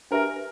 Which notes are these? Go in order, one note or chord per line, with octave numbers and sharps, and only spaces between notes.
D4 G4 A#4 B4 E5 G#5